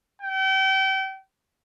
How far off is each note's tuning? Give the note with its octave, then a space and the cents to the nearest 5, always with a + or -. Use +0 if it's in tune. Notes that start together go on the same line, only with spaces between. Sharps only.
G5 -35